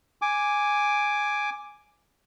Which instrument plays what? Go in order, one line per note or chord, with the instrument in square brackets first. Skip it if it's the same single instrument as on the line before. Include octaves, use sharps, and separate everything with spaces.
[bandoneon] G#5 D6